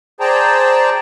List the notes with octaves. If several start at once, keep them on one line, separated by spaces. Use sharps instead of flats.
G#4 C5 D5 G5 A5 A#5